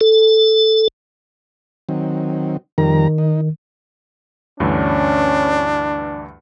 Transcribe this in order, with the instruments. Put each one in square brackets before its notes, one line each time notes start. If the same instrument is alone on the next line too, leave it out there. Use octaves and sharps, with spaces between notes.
[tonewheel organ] A4
[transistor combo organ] D#3 F#3 C4
[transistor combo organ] F2 G3 A#5 [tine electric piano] D#3
[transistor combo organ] D#4
[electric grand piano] D2 G2 E3 [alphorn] C#4 [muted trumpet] D4